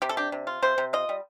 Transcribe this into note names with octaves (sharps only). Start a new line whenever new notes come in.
C3 G4
A4
D4 G4
C3
F4
C3 C5
C3
F4 D#5
G3